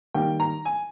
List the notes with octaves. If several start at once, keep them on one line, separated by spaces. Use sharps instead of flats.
D#3 G3 A#3 G5
A#5
G#5